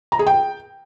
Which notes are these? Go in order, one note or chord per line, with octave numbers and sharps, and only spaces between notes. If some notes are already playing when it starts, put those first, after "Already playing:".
A#5
G#4
G5